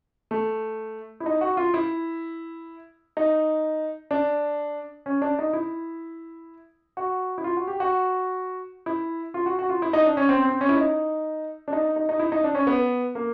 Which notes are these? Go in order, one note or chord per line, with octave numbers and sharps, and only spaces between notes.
A3
E4
D#4
F#4
F4
E4
D#4
D4
C#4
D4
D#4
E4
F#4
E4
F4
F#4
G4
F#4
E4
F4
F#4
F#4
F4
E4
D#4
D4
C#4
C4
C4
C#4
E4
D#4
D4
D#4
D#4
D#4
E4
D#4
D4
C#4
B3
A#3